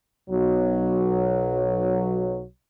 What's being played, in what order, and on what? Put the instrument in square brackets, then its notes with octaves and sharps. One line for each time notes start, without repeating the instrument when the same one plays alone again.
[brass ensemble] B1 F#3